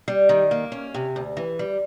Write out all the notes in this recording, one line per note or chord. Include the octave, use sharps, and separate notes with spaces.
G3
D#3
A#3
C#4
C3
D2
E3
G3